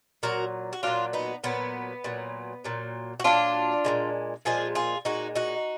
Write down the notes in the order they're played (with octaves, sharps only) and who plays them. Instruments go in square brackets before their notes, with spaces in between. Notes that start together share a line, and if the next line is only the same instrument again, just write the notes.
[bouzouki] A#2 F#3 F#4 A#4
F#4
A#2 F#3 D4 F4
B3 D#4
A#2 F#3 B3
A#2 F#3
A#2 F#3
F#4
A#2 F#3 D4 F4
A#2 F3 G#3
A#2 F3 G#3 F4 G#4
F4 G#4
A#2 G#3 D#4 F#4
D#4 F#4